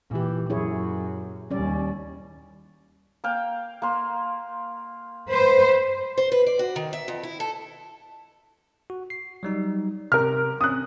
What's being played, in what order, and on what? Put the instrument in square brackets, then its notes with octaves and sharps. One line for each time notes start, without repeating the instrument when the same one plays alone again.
[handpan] A#2 G4 [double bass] E3
[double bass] F#2 [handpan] E4 G#4 C#5
[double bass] D#2 G3 [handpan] C#4 D5
[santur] A#3 F5 G5
A#3 C6
[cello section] B4 C5
[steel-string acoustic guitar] C5
B4
D5
F#4
D#3
E5
F2
E4
A4
[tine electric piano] F#4
C7
F#3 G3 D#4
[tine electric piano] C3 [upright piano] A#4 F6
[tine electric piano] C4 C#4 [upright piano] D#6 F#6